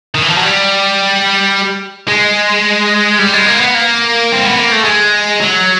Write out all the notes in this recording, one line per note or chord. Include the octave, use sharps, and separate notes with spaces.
D#3
E3
F3
F#3
G3
G#3
G3
G#3
A#3
B3
A#3
C4
B3
A#3
A3
G#3
F#3